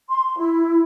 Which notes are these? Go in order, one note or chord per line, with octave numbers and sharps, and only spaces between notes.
C6
E4